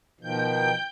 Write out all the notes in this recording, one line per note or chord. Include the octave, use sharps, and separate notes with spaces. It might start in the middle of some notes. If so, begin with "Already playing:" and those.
B2 D#3 F3 G5 G6